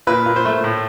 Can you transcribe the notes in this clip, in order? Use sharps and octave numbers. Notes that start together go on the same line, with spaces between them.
A#2 B4
A#2
C5
A3
A2